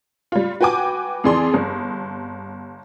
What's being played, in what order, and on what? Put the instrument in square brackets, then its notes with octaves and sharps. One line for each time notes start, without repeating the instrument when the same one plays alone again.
[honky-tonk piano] G3 F4
F#4 B4 G5 G#5 D6
F2 E3 G#4 D5 C6
G1